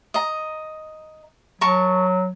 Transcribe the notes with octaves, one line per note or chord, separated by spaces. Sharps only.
D#5 A#5
F#3 A#4 A5 C#6